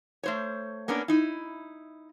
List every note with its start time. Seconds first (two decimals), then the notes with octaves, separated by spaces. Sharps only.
0.23 A3 C5 C#5
0.88 A#3 B3 C#4 D4 A#4
1.08 D#4 E4